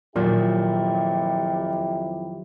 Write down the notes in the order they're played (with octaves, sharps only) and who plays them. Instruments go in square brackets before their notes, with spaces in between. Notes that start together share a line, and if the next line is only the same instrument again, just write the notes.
[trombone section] F2 E4 G4 [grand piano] A#2 [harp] D#3 F3 F#3